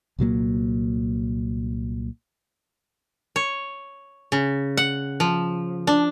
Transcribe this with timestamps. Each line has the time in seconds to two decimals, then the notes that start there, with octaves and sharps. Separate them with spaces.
0.19 C2 A#2 F#3 A#3
3.36 C#5
4.32 C#3
4.77 F#5
5.20 F3
5.87 D4